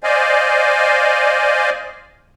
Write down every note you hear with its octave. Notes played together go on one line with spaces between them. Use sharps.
C5 D5 D#5 F5 G#5